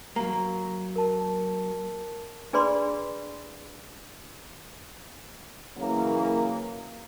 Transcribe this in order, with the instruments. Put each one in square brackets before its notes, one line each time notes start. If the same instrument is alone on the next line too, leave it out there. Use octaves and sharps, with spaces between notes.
[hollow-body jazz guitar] F#3 A#3 [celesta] A#5
[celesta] A#4 A5
[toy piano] D4 G#4 B4 D5 B5 C6
[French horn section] C#3 E3 F#3 A#3